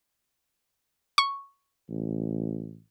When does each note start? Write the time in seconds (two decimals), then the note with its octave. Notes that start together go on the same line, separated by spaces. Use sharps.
1.18 C#6
1.89 A1